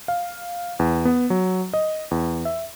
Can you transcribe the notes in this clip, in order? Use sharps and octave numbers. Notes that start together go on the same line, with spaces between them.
F5
E2
B3
F#3
D#5
E2
E5